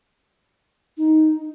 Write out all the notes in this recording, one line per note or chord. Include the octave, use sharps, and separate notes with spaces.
D#4